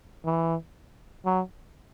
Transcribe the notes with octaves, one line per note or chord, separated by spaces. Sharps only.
E3
F#3